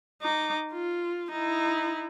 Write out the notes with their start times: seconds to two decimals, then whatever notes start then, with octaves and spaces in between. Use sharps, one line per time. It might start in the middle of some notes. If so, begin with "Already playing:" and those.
0.22 D#4 D6
0.73 F4
1.32 D#4 E4